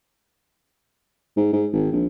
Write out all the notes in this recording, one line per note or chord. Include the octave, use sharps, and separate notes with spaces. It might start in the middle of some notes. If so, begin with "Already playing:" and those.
G#2
G#2
G#1
A#1